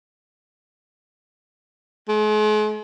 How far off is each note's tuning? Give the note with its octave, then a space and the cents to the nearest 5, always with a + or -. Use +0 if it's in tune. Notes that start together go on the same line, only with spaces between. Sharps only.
G#3 +40